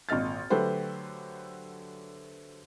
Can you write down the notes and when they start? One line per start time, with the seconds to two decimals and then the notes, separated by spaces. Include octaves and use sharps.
0.09 G#1 A#2 D#5 F6 A6
0.50 D3 F#3 A3 G4 B4 C5